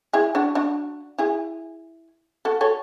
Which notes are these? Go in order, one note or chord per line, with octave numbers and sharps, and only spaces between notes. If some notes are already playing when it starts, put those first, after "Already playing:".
E4 G#4
D4 F#4
D4 F#4
E4 G#4
F#4 A4
A4 C#5